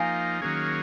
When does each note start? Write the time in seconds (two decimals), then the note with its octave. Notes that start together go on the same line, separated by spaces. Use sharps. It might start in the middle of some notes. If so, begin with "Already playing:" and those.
Already playing: F3 A#3 D#4 F5 G#5
0.42 D#3 F#3 A#3 C#4 G#4